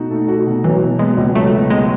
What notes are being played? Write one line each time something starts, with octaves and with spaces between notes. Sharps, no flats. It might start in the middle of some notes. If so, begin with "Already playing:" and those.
Already playing: B2 A3 D#4 F#4
A3
F#4
B2
E3 F#3
B2
G#3 B3
C#2
F#3 A3
B2
G#3 B3